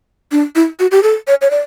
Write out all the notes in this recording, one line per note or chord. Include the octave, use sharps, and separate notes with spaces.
D4
E4
F#4
G4
A4
C#5
C#5
D5